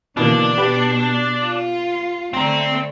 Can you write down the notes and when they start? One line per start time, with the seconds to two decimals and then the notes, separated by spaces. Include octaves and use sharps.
0.17 B2 D3 E3 A#3 D4
0.58 B2 G4 B4 B5
1.40 F4
2.34 D3 A3 C4 A#5 C6